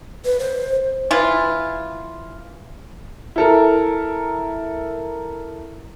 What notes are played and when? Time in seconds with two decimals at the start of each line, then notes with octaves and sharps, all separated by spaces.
0.25 B4
0.39 C5
1.11 E3 F4
3.36 E4 A4 A#4